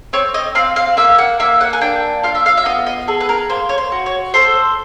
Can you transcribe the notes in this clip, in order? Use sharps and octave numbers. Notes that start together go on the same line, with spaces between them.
C4 C#5
D#5
C4 F5
F5
A#3 E5
F#5
A#3 E5
F#5
G#5
D4 G5
F4 F5
E5
F5
E5
B3 D#5
D#5
G#4 A4
B4
A#4
A#3 C5
C#5
C5
F#4
C#5
A4 C5